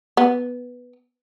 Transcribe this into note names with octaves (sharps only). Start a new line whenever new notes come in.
B3